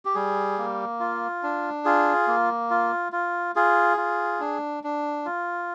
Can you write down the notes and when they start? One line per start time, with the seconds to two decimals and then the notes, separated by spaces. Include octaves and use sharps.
0.05 G4
0.15 G3 G#4
0.58 A#3
1.00 F4
1.43 D4
1.85 F4 G#4
2.27 A#3
2.70 F4
3.12 F4
3.56 F4 G#4
3.97 F4
4.40 D4
4.83 D4
5.25 F4